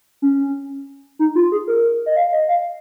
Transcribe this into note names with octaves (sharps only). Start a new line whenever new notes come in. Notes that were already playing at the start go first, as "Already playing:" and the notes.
C#4
D#4
F4
G#4
A#4
D#5
F5
D#5
F5